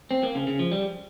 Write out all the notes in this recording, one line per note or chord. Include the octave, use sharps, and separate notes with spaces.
C4
A#3
C#3
C#3
F3
G3